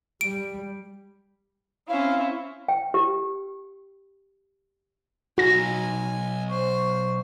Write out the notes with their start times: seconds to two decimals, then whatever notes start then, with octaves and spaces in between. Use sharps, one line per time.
0.21 G3 D7
1.89 C4 C#4 E4 F5
2.69 G5
2.94 G4
5.38 B1 D#4 F#4 G#5 A#6
6.50 C5 C#6